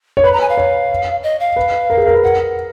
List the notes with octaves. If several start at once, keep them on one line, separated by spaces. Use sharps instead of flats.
C#5
B4 B5
A#5
G#5
F5
C#5
D#5
F5
B4
A#4
G#4
A#4
B4
A#4 F#5